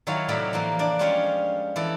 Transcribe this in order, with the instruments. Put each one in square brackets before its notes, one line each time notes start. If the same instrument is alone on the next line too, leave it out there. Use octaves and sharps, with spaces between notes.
[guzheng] D#3 F#3 E4 F4 C#5 F5
A2 C3 F#3 E4 D5 B5
E3 F3 A#3
D4 D5
F3 G3 G#3 C#4 F4 C#5
E3 E4 A4 D5